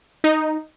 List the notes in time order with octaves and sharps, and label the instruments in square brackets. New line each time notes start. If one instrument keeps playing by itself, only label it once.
[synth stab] D#4